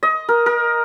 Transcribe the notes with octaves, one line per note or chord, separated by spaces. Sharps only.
D#5
A#4
A#4